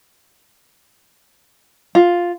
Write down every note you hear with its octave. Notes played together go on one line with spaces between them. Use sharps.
F4